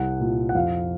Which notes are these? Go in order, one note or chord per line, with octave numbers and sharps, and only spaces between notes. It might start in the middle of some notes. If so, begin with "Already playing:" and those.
Already playing: C2 F#5
A#2
F#5
F2 F5